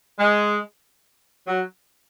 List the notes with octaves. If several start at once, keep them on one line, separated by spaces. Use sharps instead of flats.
G#3
F#3